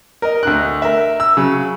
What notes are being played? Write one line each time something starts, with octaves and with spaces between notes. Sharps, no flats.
A#4 D#5
D2 D4 F#6
A#4 E5
E6
C#3 F#3